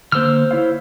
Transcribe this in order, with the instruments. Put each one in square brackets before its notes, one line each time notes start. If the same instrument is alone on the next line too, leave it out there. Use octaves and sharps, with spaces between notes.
[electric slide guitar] D3 A#3 [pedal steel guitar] C5 E6 F6
[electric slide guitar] E4 C#5 F5